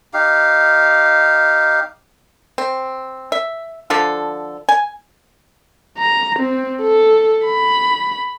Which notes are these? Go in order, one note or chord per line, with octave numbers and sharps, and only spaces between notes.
D#4 G4 F5
C4
E5
D3 F3 A4 F5
G#5
A#5
C4
A4
B5